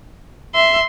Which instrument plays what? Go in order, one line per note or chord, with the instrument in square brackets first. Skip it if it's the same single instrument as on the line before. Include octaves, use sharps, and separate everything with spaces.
[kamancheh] E5 [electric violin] C6